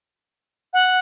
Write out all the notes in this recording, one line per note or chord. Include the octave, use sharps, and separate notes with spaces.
F#5